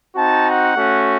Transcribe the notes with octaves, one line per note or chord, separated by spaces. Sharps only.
C4 D#4 F#4 A5
F#5
A3 C#4 F#4